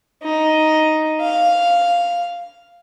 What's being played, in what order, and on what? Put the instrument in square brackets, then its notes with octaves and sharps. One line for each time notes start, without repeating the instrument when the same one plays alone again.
[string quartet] D#4
F5